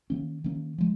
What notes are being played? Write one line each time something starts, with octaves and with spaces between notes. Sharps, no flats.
D#3 A#3 C#4
D#3 A#3 C#4
F3 G#3